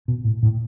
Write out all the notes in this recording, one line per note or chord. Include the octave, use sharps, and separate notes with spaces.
B2
A2
A2